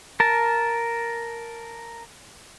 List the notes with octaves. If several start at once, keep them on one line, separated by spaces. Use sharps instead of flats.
A#4 A5